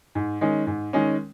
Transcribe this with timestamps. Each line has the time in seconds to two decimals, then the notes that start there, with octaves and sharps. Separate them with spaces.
0.15 G#2
0.41 D#3 G#3 C#4
0.67 G#2
0.93 D#3 G#3 C#4